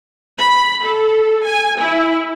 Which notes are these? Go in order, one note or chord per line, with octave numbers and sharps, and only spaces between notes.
B5
A4
G#5
E4